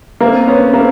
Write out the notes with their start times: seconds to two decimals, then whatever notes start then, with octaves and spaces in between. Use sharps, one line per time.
0.21 A#3 C4
0.47 B3 C#4
0.73 A#3 C4